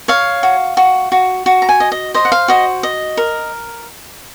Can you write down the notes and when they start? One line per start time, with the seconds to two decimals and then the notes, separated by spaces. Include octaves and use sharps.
0.08 C#5 F5
0.43 F#4
0.77 F#4
1.12 F#4
1.46 F#4
1.62 A#5
1.69 G#5
1.80 D#5
1.92 D#5
2.14 C5 D#5
2.25 F#5
2.32 F5
2.48 F#4 D#5
2.83 D#5
3.17 A#4